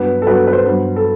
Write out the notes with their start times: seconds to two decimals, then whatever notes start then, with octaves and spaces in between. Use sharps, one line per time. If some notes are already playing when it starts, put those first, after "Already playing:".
Already playing: G2 F#3 B3 B4
0.22 A4
0.27 G2 F#3 B3 B4
0.47 B4
0.53 C5
0.65 G2 F#3 B3
0.96 A4